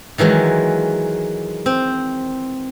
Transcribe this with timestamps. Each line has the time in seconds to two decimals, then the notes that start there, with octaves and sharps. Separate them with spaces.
0.18 D#3 E3 F#3 G#3
1.66 C4